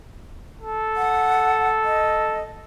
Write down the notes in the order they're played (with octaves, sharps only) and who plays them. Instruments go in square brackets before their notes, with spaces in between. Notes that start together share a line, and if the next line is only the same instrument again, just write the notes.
[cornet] A4
[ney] F#5
D#5